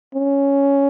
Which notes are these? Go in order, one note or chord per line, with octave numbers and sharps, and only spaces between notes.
C#4